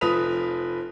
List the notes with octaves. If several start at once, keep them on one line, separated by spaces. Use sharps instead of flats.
F1 F3 B4 D#6 B6 F7